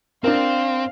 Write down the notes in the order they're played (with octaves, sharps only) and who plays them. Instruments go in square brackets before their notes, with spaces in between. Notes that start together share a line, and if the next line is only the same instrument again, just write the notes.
[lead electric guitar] C4 [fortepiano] D4 A#4 [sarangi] F5